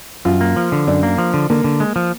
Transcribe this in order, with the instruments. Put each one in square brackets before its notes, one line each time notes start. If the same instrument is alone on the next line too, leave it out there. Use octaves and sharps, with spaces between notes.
[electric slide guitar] F#2 [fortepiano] F4
[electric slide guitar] A#3
F3
D3
[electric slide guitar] F#2 [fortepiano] D4
[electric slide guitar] A#3
F3
D3
[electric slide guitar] D3 [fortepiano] A#3
[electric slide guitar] D3
G#3
F3